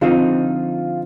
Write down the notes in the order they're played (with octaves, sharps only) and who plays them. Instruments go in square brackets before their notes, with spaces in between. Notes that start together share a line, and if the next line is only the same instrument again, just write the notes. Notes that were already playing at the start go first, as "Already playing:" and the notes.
[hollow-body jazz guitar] D3 F3 C4 D#4 [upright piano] F4